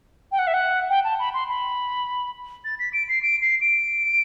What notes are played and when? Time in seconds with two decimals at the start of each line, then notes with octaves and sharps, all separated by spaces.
0.32 G5
0.39 F#5
0.47 E5
0.54 F#5
0.90 G5
1.04 A5
1.19 B5
1.34 C6
1.48 B5
2.65 A6
2.79 B6
2.93 D7
3.09 C7
3.22 D7
3.42 C7
3.61 D7